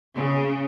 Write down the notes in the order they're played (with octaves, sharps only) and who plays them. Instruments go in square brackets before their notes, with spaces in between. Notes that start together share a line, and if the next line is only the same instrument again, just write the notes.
[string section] C#3